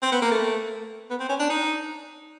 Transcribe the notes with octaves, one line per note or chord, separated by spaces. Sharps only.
C4
B3
A#3
A3
B3
C4
C#4
D4
D#4